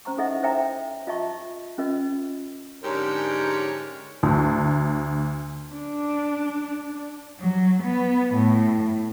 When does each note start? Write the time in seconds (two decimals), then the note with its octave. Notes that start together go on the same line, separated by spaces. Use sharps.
0.05 C#4 C5 A#5 C#6
0.17 D#4 E4 A4 D#5 E5 F#5
0.43 C5 C#5 E5 G5 A#5
1.07 F4 D#5 E5 A5 C#6
1.78 C#4 F4 A#4 D#5
2.84 G#2 D3 C#4 G4 A#4 C#5
4.23 D2
5.74 D4
7.39 F#3
7.83 B3
8.34 A2